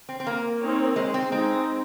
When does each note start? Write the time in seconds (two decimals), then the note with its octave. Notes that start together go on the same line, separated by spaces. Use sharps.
0.09 C4
0.20 C4
0.27 A#3
0.62 C4 D#4 A#4 C#5
0.96 G#3
1.14 C4
1.31 G#3 C4 D#4 G#4